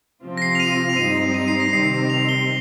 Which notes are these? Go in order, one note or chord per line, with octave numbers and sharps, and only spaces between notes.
C3 F3 C4 F4
A#6
C7
F7
D#7
F7
G2 G3 C4 D#4 D#7
D#7
C7
A#6
C3 D#3 G3 C4 C7
F7
G7